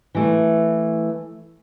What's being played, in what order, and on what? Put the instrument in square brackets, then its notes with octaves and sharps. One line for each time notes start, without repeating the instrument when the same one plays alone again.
[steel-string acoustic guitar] E3 A3